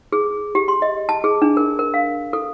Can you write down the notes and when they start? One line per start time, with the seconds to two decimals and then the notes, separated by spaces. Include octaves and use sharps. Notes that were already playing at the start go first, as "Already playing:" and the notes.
0.13 G#4
0.55 G4
0.68 C6
0.82 D#5
1.09 A5
1.24 G#4
1.42 D4
1.57 A#4
1.79 A#4
1.94 F5
2.33 A4